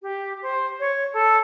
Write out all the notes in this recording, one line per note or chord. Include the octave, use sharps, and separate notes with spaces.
G4
C5
C#5
A4